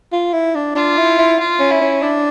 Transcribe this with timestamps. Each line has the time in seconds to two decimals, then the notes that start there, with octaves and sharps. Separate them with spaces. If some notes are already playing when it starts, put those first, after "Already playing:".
0.13 F4
0.33 E4
0.55 D4
0.75 D4 F4
0.98 E4
1.18 E4
1.39 F4
1.60 C#4
1.71 E4
1.81 C#4
2.03 D4